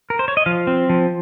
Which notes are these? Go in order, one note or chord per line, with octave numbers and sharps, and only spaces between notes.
A#4
C5
C#5
D#5
F3 F5
C4
F3